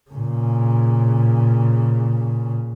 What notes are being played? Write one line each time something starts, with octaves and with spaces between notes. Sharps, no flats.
A#2 C#3